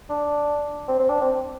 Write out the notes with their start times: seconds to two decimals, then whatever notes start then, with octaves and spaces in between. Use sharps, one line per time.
0.10 D4
0.88 C4
0.99 C4
1.10 D4
1.21 C4